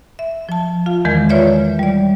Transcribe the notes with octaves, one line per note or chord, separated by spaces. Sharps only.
E5
F3 A5
F4 F5
E2 D#3 E3 G#3 A#4
F4 B4 C#5 D5 E5
G3 D5